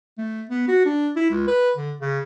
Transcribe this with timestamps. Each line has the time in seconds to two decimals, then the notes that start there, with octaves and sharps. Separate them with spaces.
0.18 A3
0.50 B3
0.68 F#4
0.86 D4
1.16 E4
1.30 C#2
1.47 B4
1.76 D3
2.01 C#3